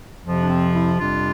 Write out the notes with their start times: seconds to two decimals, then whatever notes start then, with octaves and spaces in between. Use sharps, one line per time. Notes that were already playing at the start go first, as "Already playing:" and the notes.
0.24 F2 C3 F3
0.41 D4
0.49 C4
0.74 C4 E4
0.99 F2 C3 G3 D4 F4